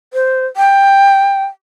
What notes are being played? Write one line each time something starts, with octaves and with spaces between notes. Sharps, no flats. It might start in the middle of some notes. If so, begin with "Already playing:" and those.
C5
G5